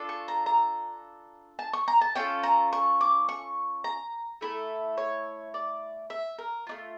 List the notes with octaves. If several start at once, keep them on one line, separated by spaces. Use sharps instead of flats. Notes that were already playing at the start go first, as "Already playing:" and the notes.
Already playing: D4 F4 A4
C#6
A#5
A#5
A5
C#6
A#5
A5
C#4 F4 A4 G5
A#5
C#6
D6
C#6
A#5
A3 E4 A4
C#5
D5
E5
A#4
A3 D4 F4